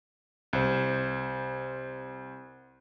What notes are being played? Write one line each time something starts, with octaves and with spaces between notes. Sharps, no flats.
C2 C5